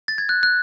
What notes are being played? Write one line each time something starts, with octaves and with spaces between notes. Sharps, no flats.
A6
G#6
F#6
F#6